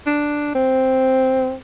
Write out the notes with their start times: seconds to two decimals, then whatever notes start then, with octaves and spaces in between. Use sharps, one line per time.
0.07 D4
0.55 C4